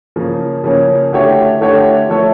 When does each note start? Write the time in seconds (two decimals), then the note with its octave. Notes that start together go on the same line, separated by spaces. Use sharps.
0.16 C#3 F3 A#3 C#4
0.64 C#3 F3 A#3 C#4
1.12 D3 A3 E4 G4 C#5
1.61 D3 A3 E4 G4 C#5
2.08 F3 A3 E4 A4 C#5